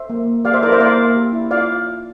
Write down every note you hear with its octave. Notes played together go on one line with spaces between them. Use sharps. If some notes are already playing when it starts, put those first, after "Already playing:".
Already playing: C5 E5
A#3
A#3
G4 D5 F5
C5 E5
E4 A#4 D5
C5 E5
A#3 D5 F5
A#3
G4
E4
F4 D5 F5